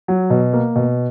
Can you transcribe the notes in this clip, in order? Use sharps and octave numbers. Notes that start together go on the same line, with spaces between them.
F#3
B2
A#3
B2